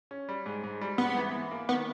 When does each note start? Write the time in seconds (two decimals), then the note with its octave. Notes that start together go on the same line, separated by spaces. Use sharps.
0.11 C#4
0.29 G3
0.46 G#2
0.64 G#2
0.81 G3
0.98 G#2 B3
1.16 E3
1.34 E3
1.51 A#3
1.69 D#3 B3